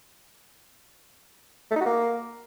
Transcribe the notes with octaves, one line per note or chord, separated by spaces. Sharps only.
A3
D#4
F#4
A#3